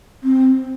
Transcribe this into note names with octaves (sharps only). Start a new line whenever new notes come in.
C4